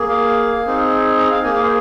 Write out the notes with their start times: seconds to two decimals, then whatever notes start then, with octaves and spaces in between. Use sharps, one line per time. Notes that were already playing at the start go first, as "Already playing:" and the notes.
Already playing: A#3 G#4
0.09 F5
0.66 C4 D#4 G#4
1.19 A#5
1.31 F5
1.44 A#3 G#4 G#5
1.54 F5
1.63 C5